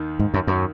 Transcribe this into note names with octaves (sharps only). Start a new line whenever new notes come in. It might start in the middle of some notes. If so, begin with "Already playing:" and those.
Already playing: D#2 D#3
G#2
F#2
F#2